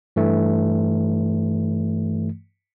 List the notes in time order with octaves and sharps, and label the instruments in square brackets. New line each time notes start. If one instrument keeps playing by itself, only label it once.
[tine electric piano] G2 E3 A3